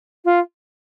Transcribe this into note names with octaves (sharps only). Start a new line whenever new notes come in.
F4